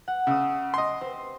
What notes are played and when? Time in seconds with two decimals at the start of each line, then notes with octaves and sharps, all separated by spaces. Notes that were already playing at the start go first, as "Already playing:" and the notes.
0.08 F#5
0.27 C#3 E5 D#6
0.74 D#5 C6
1.01 C4 G4 C5